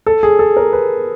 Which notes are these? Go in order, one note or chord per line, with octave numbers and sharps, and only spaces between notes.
A4
G#4
A4
A#4
B4